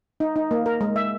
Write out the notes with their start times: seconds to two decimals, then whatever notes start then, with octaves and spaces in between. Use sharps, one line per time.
0.20 D#4
0.36 D#4
0.51 A#3
0.66 A#4
0.81 G#3
0.96 E5